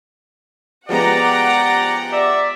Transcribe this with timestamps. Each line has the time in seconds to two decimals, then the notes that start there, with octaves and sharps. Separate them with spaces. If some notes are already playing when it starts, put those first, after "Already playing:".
0.89 F3 G#3 B3 G4 D5 F#5 A#5
2.13 D5 E5